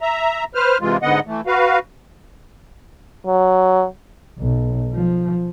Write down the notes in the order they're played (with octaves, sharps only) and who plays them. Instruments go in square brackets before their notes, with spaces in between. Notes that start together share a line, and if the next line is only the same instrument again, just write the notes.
[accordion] E5 A#5
B4 C5 F6
C3 E3 G#3 F4
G#2 D3 B3 D#5 F#5
E3 A3
F#4 B4 F5
[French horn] F#3
[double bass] B1
F3